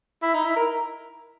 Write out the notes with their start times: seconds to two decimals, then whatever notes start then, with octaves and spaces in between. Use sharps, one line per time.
0.22 E4
0.34 D#4
0.45 E4
0.56 A#4